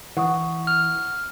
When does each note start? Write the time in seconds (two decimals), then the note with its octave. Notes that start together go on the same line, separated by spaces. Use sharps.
0.17 E3 F#5 C#6 D#6
0.67 F6